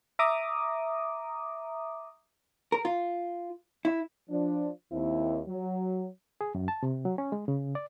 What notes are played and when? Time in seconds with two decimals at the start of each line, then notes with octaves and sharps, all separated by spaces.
0.19 E5 A#5 D6 D#6
2.72 A#4
2.85 F4
3.85 E4
4.30 F3 D4
4.92 D#2 C4 E4
5.48 F#3
6.41 G#4
6.55 F#2
6.68 A5
6.83 C3
7.05 F#3
7.18 C#4
7.32 G#3
7.48 C#3
7.75 D5